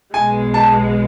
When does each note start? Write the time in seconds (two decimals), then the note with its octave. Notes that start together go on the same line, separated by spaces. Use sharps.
0.14 B1 B2 G#3 G#5
0.54 A5